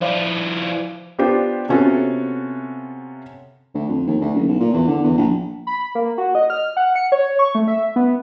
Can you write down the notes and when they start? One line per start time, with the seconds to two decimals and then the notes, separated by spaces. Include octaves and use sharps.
0.01 F3 E4 C5 D5 F5
1.18 B3 D4 F4 G4 C5
1.69 C3 B3 C#4 F4 F#4 A4
3.74 D2
3.88 F2
4.07 D#2
4.20 D2
4.34 F#1
4.48 B1
4.59 A#2
4.73 E2
4.88 D3
5.04 E2
5.17 A#1
5.67 B5
5.95 A#3
6.18 F#4
6.35 D#5
6.50 F6
6.77 F#5
6.95 C#7
7.12 C#5
7.39 C#6
7.55 A3
7.68 E5
7.96 B3